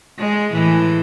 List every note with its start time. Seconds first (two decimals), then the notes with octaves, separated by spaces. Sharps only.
0.19 G#3
0.51 A2 E3